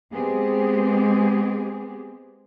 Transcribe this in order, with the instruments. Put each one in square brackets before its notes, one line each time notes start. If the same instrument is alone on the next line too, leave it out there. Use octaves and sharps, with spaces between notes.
[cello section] G#3 B3 C4 G4 G#4